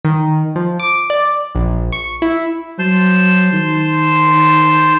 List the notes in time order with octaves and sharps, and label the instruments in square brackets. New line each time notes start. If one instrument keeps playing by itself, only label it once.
[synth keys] D#3
F3
D6
D5
A#1
C#6
E4
[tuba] F#3 [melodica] C5 A5 C6
[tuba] D#3